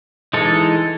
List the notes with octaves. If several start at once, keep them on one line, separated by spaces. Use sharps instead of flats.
E3 G#3 D#4 A4